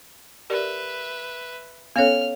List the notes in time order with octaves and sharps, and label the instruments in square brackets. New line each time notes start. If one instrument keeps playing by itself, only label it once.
[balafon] G4 A#4 D5 [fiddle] B4 E5
[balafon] B3 C#4 A4 [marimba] C#5 F5 [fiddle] F6